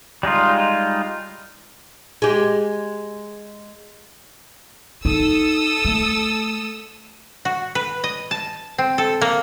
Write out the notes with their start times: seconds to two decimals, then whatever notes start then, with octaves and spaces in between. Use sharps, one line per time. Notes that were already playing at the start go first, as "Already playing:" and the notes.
0.23 G3 G#3 D#4 F4
2.22 G#3 G4
5.05 D#4 A4 D#6 E6
5.85 A3
7.45 F#4
7.75 B4
8.04 D#5
8.31 A5
8.78 C4
8.98 A4
9.21 A#3